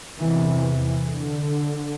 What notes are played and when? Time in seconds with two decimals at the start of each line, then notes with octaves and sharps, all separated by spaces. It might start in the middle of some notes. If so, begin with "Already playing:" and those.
0.20 E2 C3 E3
0.62 E3
1.05 D3